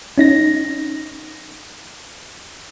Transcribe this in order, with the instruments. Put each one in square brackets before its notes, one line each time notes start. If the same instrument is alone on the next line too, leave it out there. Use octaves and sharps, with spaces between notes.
[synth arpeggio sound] C#4 D#4 A#6